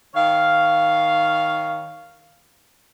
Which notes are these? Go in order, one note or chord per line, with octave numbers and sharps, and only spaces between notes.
D#3 C#5 F5